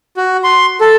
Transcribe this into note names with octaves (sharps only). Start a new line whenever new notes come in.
F#4
C6
A4